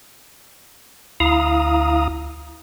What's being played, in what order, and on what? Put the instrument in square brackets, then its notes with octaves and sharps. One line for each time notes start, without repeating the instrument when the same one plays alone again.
[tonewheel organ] D2 E4 F5 A#5 D#6